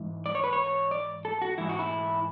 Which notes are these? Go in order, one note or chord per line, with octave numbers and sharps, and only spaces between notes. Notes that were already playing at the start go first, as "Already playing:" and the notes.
Already playing: G#2 E3
D5
C#5
B4
C#5
D5
A4
F#4
G#2 E3 E4
F#4
E4